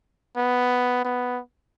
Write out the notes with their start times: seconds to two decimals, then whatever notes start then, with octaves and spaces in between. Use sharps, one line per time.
0.37 B3
1.05 B3